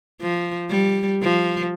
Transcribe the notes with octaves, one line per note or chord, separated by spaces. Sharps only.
F3
G3
F3